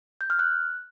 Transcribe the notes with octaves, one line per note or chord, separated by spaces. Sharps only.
G6
F6
F#6